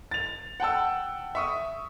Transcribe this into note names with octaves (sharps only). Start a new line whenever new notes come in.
A6 F7
F#5 G5 A5 E6
E5 C#6 D#6